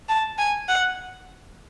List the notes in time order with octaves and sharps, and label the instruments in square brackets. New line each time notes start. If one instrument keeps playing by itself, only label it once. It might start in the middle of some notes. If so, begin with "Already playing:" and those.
[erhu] A5
G#5
F#5